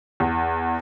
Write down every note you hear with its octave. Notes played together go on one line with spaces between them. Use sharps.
E2